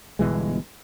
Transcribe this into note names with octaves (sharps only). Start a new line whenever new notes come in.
G1 B2 E3 G#3